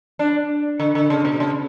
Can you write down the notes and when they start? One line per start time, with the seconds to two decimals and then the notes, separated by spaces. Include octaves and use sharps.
0.19 D4
0.80 D3
0.95 D3
1.10 C#3
1.25 B2
1.40 C#3